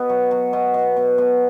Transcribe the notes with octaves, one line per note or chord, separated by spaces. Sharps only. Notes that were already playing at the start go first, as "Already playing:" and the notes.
Already playing: B2 B3
F#3
F#3
B2
B2
B2
B2